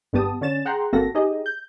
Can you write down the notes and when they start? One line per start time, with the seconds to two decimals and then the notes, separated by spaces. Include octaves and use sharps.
0.13 G1 G2 B3 G4 A5 D#6
0.41 D3 C#4 A6 E7
0.65 G#4 F#5 G5 A#5 C6
0.93 G1 A#3 C4 F#4 A4 A#6
1.15 D#4 G4 G#4 D#5
1.46 G6